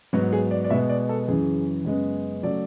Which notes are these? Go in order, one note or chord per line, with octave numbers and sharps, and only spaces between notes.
G#2 F#3 B3 F#4
G#4
D5
D5
B2 G#3 B3 E5
D5
A4
F#2 C#3 E3 G#4
F#2 C#3 G#3 B3
C#3 F#3 A3 D5